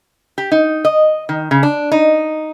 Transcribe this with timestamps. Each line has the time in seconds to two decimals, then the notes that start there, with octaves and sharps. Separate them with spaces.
0.38 G4
0.52 D#4
0.85 D#5
1.29 D#3
1.51 C#3
1.63 D4
1.92 D#4